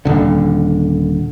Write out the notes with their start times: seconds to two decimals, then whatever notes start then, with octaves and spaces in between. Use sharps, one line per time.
0.05 D#1 D3